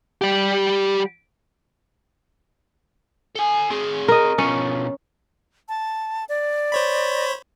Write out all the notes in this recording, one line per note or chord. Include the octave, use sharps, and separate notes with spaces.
G3 G4
A4 G#5
C4 G#4
A#4 D#5
B2 F3 C#4
A5
D5
C5 C#5 B5